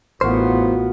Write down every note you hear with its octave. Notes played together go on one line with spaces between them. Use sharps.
A1 E2 B3 F4 F#4 A#4 C5